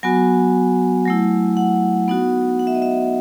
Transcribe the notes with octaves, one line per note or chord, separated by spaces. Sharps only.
F#3 B3 F#4 G#5
F#3 A3 E4
F#5
B3 D#4 F#4
F#5
E5
D#5
E5